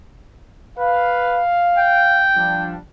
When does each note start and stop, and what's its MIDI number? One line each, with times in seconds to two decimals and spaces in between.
0.78 1.42 71
0.78 2.22 77
1.77 2.71 79
2.35 2.76 53
2.35 2.76 55
2.35 2.76 62